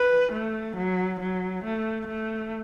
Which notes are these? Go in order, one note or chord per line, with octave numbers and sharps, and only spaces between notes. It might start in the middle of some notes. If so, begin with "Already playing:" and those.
Already playing: B4
A3
F#3
F#3
A3
A3